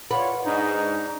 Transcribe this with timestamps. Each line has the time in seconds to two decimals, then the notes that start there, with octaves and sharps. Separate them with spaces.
0.11 F4 B4 C#5 D5 F#5
0.45 G#2 D4 D#4